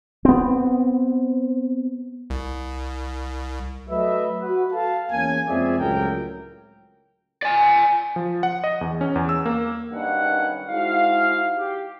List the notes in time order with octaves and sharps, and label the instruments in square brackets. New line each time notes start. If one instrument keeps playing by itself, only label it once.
[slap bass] B3 C4
[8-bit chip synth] C2
[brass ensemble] F#3 A3 B4 D#5 E5
F#4 B4
A4 F5 A5
E2 A#3 C#4 G#5
F2 G#3 C4 G#4 D5 E5
C#2 A2 F#3 A#4 G5
[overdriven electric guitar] D5 G#5
[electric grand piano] F3
F#5
D#5
E2
C#4
E2
E6
A#3
[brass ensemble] B1 G2 D#3 C#4 F#5
G#2 E4 F#4 F5
G4